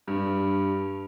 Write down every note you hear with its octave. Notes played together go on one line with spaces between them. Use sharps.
G2